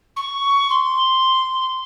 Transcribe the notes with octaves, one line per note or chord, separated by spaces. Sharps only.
C#6
C6